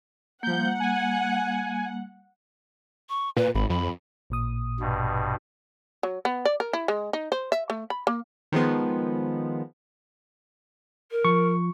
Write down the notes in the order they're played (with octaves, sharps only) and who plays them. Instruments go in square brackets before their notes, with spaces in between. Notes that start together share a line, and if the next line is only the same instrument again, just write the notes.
[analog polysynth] F3 G6 [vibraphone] G3 A#3 [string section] F#5
[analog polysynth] G#5
[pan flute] C#6
[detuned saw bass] A#2 [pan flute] B4
[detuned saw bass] G#1 [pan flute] B5
[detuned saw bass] F2 [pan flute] B5
[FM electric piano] A1 A#2 D#6
[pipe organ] G2 B2
[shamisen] F#3
B3
D5
A#4
E4
G#3
D#4
C5
E5
A3
B5
A#3
[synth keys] D#3 F3 G#3 B3
[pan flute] A#4
[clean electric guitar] F3 [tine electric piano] C#6